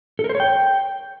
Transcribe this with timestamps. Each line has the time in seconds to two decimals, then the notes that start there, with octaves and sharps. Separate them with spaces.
0.19 A4
0.24 A#4
0.29 C5
0.35 C#5
0.40 G5